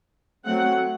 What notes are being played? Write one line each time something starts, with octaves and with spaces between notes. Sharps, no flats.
F#3 A3 C4 F#5